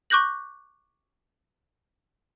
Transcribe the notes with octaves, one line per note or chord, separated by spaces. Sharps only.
C#6 D6 F#6 G6 A#6 F#7